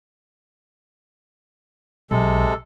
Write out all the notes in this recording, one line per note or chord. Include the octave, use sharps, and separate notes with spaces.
B1 C3 G#3 A4